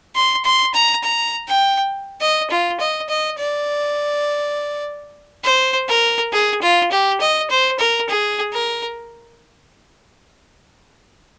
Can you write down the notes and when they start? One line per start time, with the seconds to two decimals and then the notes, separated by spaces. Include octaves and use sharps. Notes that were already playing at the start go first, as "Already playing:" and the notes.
0.15 C6
0.45 C6
0.74 A#5
1.04 A#5
1.48 G5
2.21 D#5
2.50 F4
2.80 D#5
3.09 D#5
3.39 D5
5.44 C5
5.89 A#4
6.33 G#4
6.62 F4
6.91 G4
7.21 D#5
7.50 C5
7.79 A#4
8.09 G#4
8.53 A#4